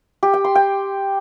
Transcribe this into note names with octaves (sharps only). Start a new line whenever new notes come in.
G4
G5
C6
G5